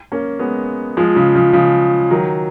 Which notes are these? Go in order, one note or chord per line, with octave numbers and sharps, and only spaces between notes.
A#3 C#4
G#3 B3
F3 G#3
C#3 F3
C#3 F3
C#3 F3
D#3 F#3